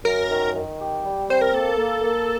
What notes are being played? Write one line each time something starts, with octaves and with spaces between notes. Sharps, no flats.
F#2 A#4
D#3
D#3
G4
G3
C4 C5
A#4
A#3 A4
A#3
A#3